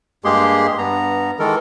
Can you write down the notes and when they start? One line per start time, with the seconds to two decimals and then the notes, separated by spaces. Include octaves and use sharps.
0.24 G2 G#3 A#3 G4 G#4 C6
0.78 G2 B3 A#5
1.39 D#3 E3 G#3 A4 A#4